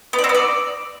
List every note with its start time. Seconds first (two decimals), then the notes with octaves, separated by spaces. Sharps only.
0.13 B3
0.19 D5
0.24 C4
0.29 B3
0.34 D5